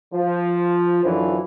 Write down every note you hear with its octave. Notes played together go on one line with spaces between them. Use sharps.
F3
F#2 D3 E3 F3